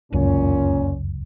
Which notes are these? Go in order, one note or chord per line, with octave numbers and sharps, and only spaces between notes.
F1 C#2 F#2 A#2 C#4